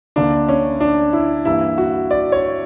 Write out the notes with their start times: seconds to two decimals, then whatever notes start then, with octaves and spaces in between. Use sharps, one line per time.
0.16 D2 D3 A#3 D4
0.49 C#4
0.80 D4
1.13 E4
1.45 G2 E3 G3 A#3 E4
1.78 F#4
2.11 D5
2.32 C#5